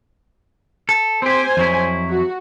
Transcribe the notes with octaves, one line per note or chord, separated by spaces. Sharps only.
A4
C4 G4 C5 G#5
F2 F#3 E4
F#4